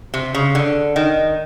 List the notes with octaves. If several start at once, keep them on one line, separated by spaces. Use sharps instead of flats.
C3
C#3
D3
D#3